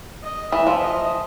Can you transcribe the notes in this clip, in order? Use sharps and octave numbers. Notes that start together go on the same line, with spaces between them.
D#5
E3 E5
F3
D#5